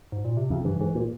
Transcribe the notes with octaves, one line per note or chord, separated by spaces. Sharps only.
G#2
A#2
C3
F2 C#3
G2 E3
G#2 E3
A#2